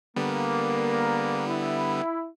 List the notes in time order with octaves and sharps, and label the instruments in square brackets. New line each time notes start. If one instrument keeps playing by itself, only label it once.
[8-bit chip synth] D3 G3 B3 [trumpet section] A#3
[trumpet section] E4